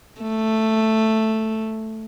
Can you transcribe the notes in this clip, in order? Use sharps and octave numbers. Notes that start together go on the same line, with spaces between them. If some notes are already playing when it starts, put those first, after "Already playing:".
A3